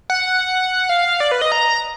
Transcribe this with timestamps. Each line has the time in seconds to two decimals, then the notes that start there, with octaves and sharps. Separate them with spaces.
0.10 F#5
0.89 F5
1.20 D5
1.32 B4
1.41 D#5
1.52 A#5